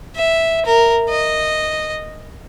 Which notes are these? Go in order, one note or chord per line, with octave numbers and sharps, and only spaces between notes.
E5
A#4
D#5